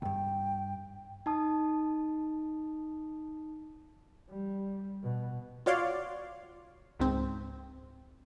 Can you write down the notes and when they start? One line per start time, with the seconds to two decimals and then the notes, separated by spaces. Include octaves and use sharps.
0.02 D2 G2 G5
1.26 D#4 A5 D#6
4.29 G3
5.04 B2
5.66 F4 F#4 C#5 D5 F5 C6
6.99 C#2 G#2 C4